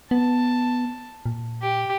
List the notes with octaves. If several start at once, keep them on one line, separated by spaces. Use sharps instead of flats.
B3 A5
A#2
G4